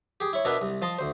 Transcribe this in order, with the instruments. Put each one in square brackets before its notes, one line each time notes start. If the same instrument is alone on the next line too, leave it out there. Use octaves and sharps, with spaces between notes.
[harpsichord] G4 G#4
E4 C#5
B2 B3 D4 A#4 B4 E5
C2
F3 D#5 A5 C6
D2 C5